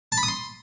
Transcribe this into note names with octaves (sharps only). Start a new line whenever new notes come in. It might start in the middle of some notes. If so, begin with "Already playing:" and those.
A5
B5
D#6
C6